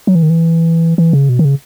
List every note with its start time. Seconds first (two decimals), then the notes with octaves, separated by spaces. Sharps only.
0.07 F#3
0.15 E3
0.23 D#3
0.30 E3
0.98 E3
1.13 C#3
1.29 B2
1.39 D#3
1.45 C#3